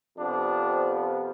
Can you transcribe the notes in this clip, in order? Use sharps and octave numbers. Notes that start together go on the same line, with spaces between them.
F2 C3 F3 B3 D4